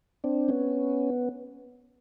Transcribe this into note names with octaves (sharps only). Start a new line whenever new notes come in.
C4 D4
B3 C#4